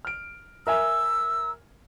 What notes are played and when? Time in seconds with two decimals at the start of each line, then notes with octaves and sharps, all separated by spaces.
0.05 F6 D7
0.67 A#4 E5 G#5 E6